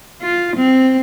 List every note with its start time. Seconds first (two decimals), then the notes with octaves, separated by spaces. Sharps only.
0.22 F4
0.57 C4